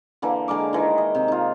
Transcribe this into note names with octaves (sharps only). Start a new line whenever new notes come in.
D3 E3 A#3
D3 G#3 A#4 D6
D#3 E3
D#5
C3
D#4 F4